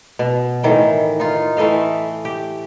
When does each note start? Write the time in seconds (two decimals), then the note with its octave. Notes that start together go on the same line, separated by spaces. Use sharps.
0.19 B2
0.63 A2 D#3 E3 G5
1.20 D#4 F4
1.57 E3 A3 D#5 F5
2.25 G4